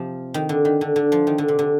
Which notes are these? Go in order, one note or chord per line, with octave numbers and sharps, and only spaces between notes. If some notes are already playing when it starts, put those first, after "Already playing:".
Already playing: C3 F3
D#3
D3
D#3
D3
D3
F3
D#3
D3
C3
D3